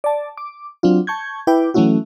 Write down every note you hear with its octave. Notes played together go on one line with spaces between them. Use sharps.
D5 A5
D6
F#3 C4 D4 F4
A5 C#6 G6 G#6
E4 B4 G5 D6
E3 F#3 A3 C#4 E4 F#4